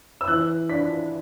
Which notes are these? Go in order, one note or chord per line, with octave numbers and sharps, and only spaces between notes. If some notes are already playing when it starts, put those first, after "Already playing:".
E6
E3 F#6
D4 B6